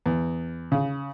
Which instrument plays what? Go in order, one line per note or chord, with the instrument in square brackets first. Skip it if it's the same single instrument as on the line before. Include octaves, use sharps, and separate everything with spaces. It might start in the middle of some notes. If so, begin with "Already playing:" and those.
[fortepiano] E2
C#3